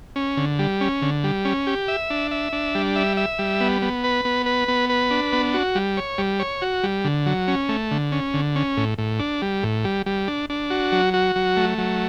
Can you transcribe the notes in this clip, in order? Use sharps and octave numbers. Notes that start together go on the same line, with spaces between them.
C#4
D3
G3
C#4
D3
G3
C#4
G4
E5
D4
E5
D4
G3
E5
E5
G3
B3
B3
B4
B3
B4
B3
B4
D4
B3
F#4
G3
C#5
G3
C#5
F#4
G3
D3
F#3
C#4
A3
D3
C#4
D3
C#4
A2
A2
D4
G3
A2
G3
G3
D4
D4
F#4
F#3
F#4
F#3
A3
F#3